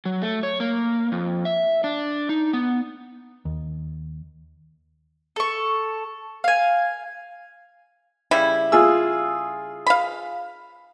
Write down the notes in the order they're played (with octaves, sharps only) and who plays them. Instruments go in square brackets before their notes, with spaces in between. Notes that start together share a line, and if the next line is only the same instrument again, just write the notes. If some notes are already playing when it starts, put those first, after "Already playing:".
[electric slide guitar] F#3
A3
C#5
A#3
F2
E5
D4
D#4
B3
[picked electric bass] D#2
[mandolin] A4 C#6
F5 G#5
[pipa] C#3 G3 E4
[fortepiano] F4 G#4 E6
[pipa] F5 B5